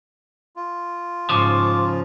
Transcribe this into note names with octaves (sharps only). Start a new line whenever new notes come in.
F4
G#2 C#3 F3 D6